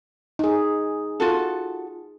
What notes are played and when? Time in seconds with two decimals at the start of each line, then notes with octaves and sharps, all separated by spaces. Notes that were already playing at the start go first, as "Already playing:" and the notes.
0.39 D#4 G#4
1.20 F4 F#4 A4